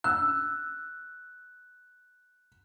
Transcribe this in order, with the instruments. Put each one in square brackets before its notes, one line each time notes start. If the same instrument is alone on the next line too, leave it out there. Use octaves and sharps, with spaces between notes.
[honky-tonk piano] E6 [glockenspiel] F#6